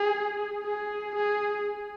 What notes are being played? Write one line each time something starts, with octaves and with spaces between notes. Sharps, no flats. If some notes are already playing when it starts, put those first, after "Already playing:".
Already playing: G#4
G#4
G#4